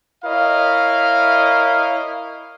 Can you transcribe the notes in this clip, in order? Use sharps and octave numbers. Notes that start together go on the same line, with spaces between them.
E4 A#4 C#5 D#5 F5